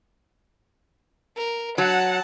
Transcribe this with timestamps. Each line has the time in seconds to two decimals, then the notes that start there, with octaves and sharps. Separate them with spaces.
1.37 A#4
1.78 F#3 F#5 A5